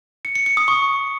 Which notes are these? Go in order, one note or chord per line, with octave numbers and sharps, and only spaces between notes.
C#7
C#7
C#7
D#6
C#6